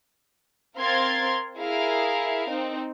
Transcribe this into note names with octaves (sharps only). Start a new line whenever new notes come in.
C4 A#4 F5 C6 G#6 A6
E4 G#4 A#4 F5
C4 D#4